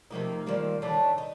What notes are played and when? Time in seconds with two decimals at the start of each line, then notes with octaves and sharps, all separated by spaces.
0.10 C3 D#3 F3 A3 A#3 D#4
0.46 A#2 D#3 F3 G3 A#3
0.82 A2 D#3 G3 A3 D4
1.18 D#4